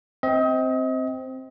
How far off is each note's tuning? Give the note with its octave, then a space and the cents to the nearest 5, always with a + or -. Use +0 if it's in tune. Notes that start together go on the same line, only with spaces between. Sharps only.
C4 +0 D#5 +35